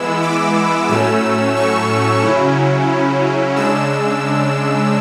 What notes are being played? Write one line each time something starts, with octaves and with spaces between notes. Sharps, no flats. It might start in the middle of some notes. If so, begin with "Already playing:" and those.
Already playing: E3 G#3 B3 E4 E6
D6
A2 F#3 A3 C#4 E6
C#6
C#3 F#3 C#4 E4
C#3 G#3 D4 E6